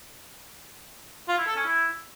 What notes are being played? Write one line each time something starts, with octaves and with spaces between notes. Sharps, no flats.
F4
E4
A4
C#4
E4